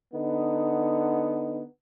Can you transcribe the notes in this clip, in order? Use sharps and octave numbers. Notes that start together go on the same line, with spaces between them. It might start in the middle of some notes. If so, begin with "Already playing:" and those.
D3 B3 D#4